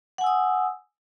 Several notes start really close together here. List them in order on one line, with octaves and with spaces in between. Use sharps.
F#5 G#5 E6 D#6